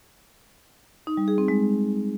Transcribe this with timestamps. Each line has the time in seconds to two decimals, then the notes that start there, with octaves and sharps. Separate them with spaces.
1.07 D#4
1.17 G3
1.28 G#4
1.38 C4
1.48 G#3